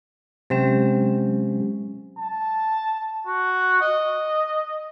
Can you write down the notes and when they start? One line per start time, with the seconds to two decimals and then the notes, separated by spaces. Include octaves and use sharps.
0.50 C3 F#3 G#3 C#4 C5 G5
2.19 A5
3.27 F#4
3.82 D#5